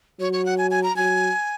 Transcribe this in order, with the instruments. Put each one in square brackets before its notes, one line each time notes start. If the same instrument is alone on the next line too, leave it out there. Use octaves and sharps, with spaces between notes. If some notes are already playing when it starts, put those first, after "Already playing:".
[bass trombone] F#3 [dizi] C#5
[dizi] C#5
F#5
G#5
G#5
A#5
[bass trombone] F#3 [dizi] G#5